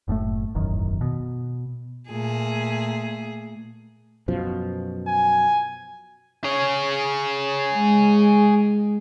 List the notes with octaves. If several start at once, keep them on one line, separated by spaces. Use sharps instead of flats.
F#1 A2 C3 A3
E1 A1 F#2 D#3
B2
A#2 A3 G#4
F#2 B2 F3
G#5
G#4 C#5
G#3